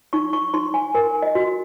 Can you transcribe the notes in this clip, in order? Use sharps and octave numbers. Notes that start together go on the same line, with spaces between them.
D#4 C#6
C#6
D#4 C6
G#5
A#4 G#5
D#5
F#4